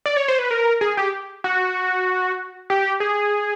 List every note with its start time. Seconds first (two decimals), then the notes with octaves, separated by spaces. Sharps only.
0.06 D5
0.17 C#5
0.28 C5
0.39 B4
0.51 A#4
0.81 G#4
0.97 G4
1.44 F#4
2.70 G4
3.00 G#4